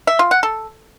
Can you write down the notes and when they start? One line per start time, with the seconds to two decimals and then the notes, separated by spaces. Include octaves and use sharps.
0.07 E5
0.19 F4
0.31 F#5
0.43 A4